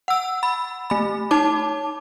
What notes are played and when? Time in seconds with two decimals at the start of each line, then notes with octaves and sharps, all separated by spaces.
0.08 F#5 E6
0.43 B5
0.90 A3 B5
1.31 D#4 A5 D6